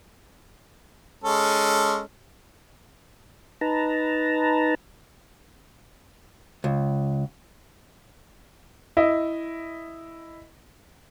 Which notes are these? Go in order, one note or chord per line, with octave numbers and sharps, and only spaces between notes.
G#3 C#4 A4
D#4 B4 A5 A#5
C#2
E4 D#5